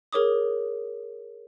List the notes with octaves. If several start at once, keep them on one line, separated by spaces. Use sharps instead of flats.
G#4 A#4 C#5 D6 D#6